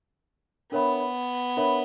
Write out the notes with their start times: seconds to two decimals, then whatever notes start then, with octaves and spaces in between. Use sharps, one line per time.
0.72 B3 D4 A#4 C#5 E5 B5
1.57 D4 A#4 C#5 E5 B5